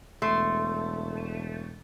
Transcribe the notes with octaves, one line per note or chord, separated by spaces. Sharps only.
E1 A3 C6